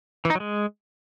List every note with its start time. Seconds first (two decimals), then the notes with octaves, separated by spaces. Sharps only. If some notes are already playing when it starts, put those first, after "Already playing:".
0.25 E3
0.30 D#4
0.35 F#3
0.40 G#3